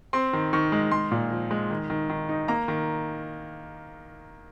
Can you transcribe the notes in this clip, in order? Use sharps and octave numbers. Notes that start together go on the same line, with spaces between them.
C4 C6
D#3
D#3 C#6
G#3
G#3 C6
A#2
F3
G#3
D#3
D#3
D#3
D#4
A#3 A#5
D#3